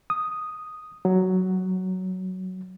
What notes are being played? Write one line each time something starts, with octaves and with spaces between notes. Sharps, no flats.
D#6
F#3